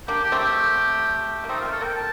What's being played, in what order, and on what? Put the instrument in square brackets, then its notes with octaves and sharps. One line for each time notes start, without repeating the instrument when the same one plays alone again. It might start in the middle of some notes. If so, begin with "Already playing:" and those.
[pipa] A#3 D4 [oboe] G4
[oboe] G4
[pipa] A3 C4
[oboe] G4
[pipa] A#3
[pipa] A3 C4 [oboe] D#4
[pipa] A#3
[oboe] F4
[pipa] A3
[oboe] A4
[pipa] A#3 [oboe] G5
[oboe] A5